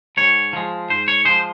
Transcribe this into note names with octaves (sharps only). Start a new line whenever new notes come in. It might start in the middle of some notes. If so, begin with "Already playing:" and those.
G#2 C#5
F3 G#3
G#2 C5
C#5
F3 G#3 C5